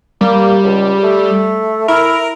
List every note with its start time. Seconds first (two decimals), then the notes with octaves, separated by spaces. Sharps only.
0.21 G3 A#3
0.64 C#2
1.03 A3
1.88 E4 A#4